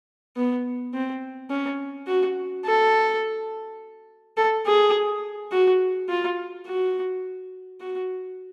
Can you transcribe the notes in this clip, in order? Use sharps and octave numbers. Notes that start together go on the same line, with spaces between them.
B3
C4
C#4
F#4
A4
A4
G#4
F#4
F4
F#4
F#4